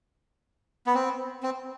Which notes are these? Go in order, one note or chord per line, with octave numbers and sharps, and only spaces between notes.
B3
C4
C4